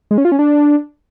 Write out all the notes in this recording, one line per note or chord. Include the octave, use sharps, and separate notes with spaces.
G#3
C#4
F4
C#4
D4